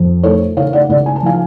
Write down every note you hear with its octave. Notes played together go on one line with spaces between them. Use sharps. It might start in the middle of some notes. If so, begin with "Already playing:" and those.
Already playing: F2
A3 A4 C#5
C#3 C#5 F5
D5 F#5
C#2 D5 F#5
G#5
A5
F3 F5 G#5